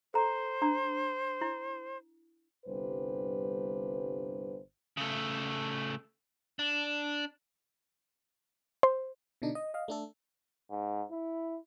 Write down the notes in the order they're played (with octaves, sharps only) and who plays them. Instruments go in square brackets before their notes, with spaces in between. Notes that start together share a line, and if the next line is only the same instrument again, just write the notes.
[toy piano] A4 A#5 [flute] C5
[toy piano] D4 A#5 D#6
E4
[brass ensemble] G1 C2 G2 G4 B4 C5
[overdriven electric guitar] C#3 A3
D4
[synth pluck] C5
[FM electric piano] B2 D3 D4 D#4
D#5
D#5 F5
A3 D4 A4
[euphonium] G#2
E4